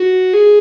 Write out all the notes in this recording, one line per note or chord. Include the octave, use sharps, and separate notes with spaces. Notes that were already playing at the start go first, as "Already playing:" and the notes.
Already playing: F#4
G#4